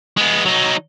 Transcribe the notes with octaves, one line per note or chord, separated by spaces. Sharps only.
G#3 B3
F#3 D#4